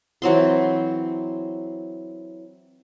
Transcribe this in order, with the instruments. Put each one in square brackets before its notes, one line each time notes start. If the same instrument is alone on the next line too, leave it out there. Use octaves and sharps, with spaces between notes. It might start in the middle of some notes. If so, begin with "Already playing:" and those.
[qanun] E3 F#3 C4 C6